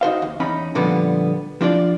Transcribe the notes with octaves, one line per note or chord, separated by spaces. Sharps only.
D#4 F#4 C5 F5
D#2
E2 C#4 D#4 B5
A#2 D3 F3 G3 B3
F3 D4 F4 D5